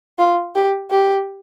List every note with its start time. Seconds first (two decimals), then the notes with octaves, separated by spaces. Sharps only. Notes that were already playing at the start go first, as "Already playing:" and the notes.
0.19 F4
0.55 G4
0.91 G4